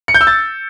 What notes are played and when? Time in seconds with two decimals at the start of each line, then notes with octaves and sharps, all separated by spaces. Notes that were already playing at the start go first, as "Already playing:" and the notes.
0.08 C#7
0.14 G6
0.21 E6
0.27 A6